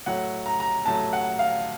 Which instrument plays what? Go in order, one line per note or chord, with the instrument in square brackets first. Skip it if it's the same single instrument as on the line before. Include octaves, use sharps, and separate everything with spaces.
[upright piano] A2 F#3 F#5
A#5
A#5
A2 F#3 A5
F#5
F5